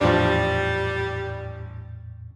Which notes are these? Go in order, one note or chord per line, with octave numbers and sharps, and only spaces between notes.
A1 E2 A2 F3 G3 D4